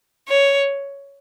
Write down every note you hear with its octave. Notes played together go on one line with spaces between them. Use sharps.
C#5